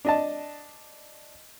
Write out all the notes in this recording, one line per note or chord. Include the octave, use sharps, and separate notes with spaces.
D4 D#5 A5